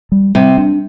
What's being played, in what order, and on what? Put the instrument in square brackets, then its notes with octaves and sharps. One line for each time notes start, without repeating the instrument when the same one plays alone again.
[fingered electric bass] G3
[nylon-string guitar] C3 [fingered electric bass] G3
[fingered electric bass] D4